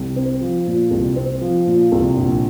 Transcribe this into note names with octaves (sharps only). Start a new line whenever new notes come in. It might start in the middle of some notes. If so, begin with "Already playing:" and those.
Already playing: C2
C4
F3
A#2
C2
C4
F3
A#2
C2
A#1